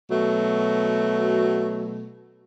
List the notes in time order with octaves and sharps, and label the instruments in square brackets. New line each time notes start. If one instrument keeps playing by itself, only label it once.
[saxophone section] B2 F#3 A3